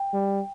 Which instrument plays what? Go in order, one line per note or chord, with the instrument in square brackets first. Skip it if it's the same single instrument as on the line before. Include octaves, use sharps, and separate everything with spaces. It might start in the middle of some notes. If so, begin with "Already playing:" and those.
Already playing: [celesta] G5
[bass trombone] G3